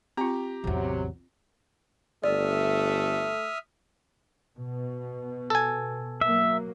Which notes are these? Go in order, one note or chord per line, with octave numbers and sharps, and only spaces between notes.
C4 F4 G4 A#5
A1 E2 C3 F#3
G1 A3 D5 E5 D#6 F6
B2
A4 G#5
F#3 A#3 E5